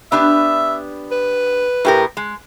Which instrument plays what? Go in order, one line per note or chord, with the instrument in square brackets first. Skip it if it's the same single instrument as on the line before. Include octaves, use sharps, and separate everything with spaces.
[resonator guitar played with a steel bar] B3 D4 G4 [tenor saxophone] E5
[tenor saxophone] B4
[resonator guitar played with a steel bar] A2 G4 A#4
G#3